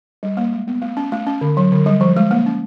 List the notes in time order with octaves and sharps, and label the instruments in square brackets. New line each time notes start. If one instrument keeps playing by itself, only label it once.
[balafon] G3
A#3
G#3
B3
A3
C#4
A3
C#4
D3
F#3
D3
G3
F3
G#3
A#3
C#4